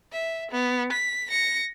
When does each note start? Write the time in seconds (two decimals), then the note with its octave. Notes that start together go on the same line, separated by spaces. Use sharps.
0.12 E5
0.51 B3
0.93 B6
1.30 A#6 C#7